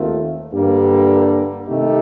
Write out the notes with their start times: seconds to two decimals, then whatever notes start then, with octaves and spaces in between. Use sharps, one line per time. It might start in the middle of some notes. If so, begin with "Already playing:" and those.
Already playing: D#2 D#3 A3 C4 F4
0.53 G2 D3 G3 A#3
1.68 C3 D#3 A3 D#4 G4